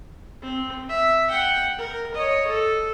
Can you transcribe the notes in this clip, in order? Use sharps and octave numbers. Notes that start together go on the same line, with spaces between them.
C4
E5
F#5 G5
A#4
C#5 D#5
A4